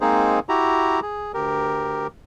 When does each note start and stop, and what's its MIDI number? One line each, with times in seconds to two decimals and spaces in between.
0.01 0.39 56
0.01 0.39 58
0.01 0.39 60
0.01 0.39 63
0.01 0.39 68
0.01 0.39 72
0.49 1.00 64
0.49 1.00 66
0.49 1.00 67
0.49 1.00 82
1.02 1.32 68
1.34 2.07 38
1.34 2.07 67
1.34 2.07 70